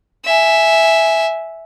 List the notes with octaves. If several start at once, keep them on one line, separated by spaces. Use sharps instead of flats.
E5 G#5